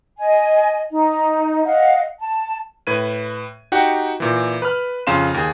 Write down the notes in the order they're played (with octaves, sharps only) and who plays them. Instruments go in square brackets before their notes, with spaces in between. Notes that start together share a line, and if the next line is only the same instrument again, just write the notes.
[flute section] D#5 G#5
D#4
D#5 F5 F#5
A5
[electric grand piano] A2 B4 G#6 D#7
D#4 F#4 G4 F#5 G5
A#2 E3
B4 B5 F6
F2 C#3 F5 C6 E7
D#2 G#4